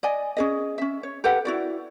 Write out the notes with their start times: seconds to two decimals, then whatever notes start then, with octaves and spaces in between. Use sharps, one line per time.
0.03 D5 D#5 G#5
0.37 C#4 G#4 D#5
0.78 C#4 E5
1.03 C#5
1.24 G4 A4 B4 F#5
1.45 E4 F#4 D5